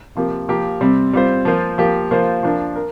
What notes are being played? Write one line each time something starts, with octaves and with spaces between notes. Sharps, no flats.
C3 F3 A#3 G4
F3 A#3 G4 A#4
C3 G3 C4
G3 C4 F4 C5
F3 A#3 F4 C5
F3 A#3 G4
F3 A#3 F4 C5
F3 D4 A#4
A#4